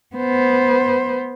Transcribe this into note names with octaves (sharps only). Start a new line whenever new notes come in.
B3 C5